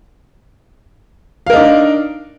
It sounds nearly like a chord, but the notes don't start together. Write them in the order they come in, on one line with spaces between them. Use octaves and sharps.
F5 A#4 D#4 D4